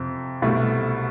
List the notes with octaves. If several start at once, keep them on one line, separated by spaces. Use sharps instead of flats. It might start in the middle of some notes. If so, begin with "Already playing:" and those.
Already playing: F2 C3
C2 B2 A3